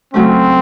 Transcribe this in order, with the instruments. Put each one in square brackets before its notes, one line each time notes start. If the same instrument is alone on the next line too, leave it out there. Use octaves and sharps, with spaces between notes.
[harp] C#3 F#3 A3 C#4 [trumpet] C4